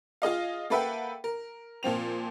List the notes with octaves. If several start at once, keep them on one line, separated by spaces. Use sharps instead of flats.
F4 G#4 D#5 F5
A#3 A4 B4 E5 F#5 G5
A#4
A#2 F3 C4 F7